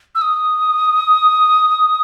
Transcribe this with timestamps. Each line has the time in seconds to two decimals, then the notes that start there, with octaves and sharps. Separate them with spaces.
0.15 E6
0.21 D#6